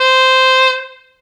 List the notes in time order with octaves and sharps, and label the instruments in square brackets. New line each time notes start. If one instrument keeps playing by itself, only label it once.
[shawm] C5